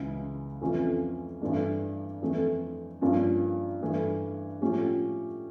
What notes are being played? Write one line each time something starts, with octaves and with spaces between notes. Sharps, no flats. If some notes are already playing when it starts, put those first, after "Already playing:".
Already playing: C#2 C#3 E3
F2 E3 A3 C#4 F4
G2 E3 A3 D4
F2 E3 A3
G2 F3 A#3 C#4
G2 E3 A3
A2 F3 C#4 G4